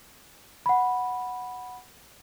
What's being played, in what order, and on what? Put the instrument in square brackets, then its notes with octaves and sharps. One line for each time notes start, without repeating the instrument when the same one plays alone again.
[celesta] F#5 B5